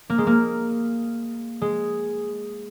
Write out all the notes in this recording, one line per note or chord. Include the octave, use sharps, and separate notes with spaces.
A#3
G#3
A#3
G#3